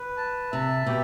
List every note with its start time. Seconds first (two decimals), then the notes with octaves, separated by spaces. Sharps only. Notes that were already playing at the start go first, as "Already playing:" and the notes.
Already playing: B4
0.17 A5
0.52 C3 E5
0.86 B2 G4